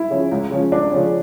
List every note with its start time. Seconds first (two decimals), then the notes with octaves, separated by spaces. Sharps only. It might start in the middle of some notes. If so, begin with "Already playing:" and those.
Already playing: E4
0.10 C#3 F3 C#4
0.31 C#2
0.51 C#3 F3 C#4
0.71 C#2 D4
0.92 C#3 F3 C#4